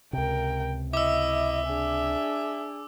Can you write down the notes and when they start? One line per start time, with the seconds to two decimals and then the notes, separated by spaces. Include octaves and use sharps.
0.13 C#2 C3 A#4 G5
0.94 E4 D#5 E5 D6 E6
1.67 D4 G#4